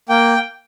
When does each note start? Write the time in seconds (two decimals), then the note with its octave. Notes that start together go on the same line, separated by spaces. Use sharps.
0.09 A#3 G5